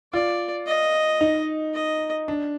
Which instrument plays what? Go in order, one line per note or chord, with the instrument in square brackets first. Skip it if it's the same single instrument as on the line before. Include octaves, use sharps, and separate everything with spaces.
[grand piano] F4 [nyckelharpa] D5
[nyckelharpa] D#5
[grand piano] D#4
[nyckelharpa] D#5
[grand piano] D4